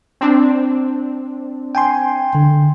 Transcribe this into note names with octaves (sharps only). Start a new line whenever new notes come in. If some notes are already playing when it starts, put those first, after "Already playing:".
C4 D4
G5 G#5 C6
D3